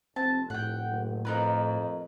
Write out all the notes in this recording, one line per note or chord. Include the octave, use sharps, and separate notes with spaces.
F1 C4 A5
A2 F#5 G5
F#1
F2 D#4 A#4 B4